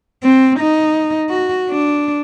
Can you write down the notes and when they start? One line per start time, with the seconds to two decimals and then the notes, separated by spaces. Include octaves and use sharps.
0.23 C4
0.59 D#4
1.29 F#4
1.70 D4